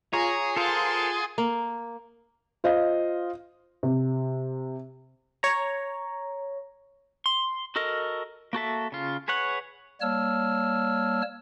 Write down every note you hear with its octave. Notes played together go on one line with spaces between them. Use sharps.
F4 G#4 C#5 G#5 A#5
F4 A4 A#4 C5 F#5 C6 A6
A#3
F4 C5 D#5 F5
C3
C#5 A#5
C6
F#4 A4 A#4 D#5
A#3 F#4 A4 E5
C#3 F4
G#4 B4 C#5 F#5
G3 A#3 C#5 A5 E6 F6